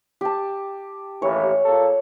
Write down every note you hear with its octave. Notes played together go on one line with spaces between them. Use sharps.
G4 A5
A1 D#2 E3 C#5
A#2 A#3 A4